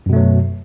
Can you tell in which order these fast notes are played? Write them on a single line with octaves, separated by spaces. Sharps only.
F#2 B2 A3 F#3